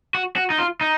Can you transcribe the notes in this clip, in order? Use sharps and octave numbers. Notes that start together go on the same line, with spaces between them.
F#4
F#4
D#4
F4
D#4